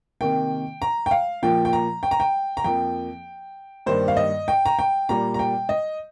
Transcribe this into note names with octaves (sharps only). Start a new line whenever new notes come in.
C3 D#3 A#3 G5
A#5
G5
F5
A#2 F3 A#3 G5
G5
A#5
G5
A#5
G5
A#5
F2 F3 A#3 G5
G2 D#3 G3 A#3 C5
F5
D#5
G5
A#5
G5
A#2 G3 A#3 A#5
A#5
G5
D#5